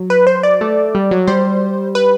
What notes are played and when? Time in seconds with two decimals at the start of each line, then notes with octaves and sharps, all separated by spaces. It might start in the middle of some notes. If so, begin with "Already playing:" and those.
Already playing: F#3
0.10 B4
0.27 C5
0.43 D5
0.61 A3
0.95 G3
1.11 F#3
1.27 G3 C5
1.95 B4